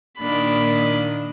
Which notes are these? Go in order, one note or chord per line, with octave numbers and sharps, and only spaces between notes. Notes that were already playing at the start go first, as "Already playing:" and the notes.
A#2 D#3 D4 B5